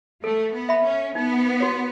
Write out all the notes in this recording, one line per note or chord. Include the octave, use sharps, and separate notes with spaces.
A3 A4
B3
E5 B5
C#4
B3 D#4
F#4 C#5